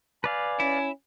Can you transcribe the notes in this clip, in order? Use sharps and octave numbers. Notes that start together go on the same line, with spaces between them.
B4 D5 F5 G#5
C#4 E4